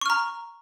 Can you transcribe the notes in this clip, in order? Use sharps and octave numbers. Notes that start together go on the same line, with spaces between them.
A#5 C#6 F6